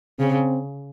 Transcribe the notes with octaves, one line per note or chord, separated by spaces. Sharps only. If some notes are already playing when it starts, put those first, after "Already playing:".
C#3 C4